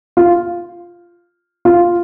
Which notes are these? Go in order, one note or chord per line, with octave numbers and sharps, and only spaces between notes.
F4
F4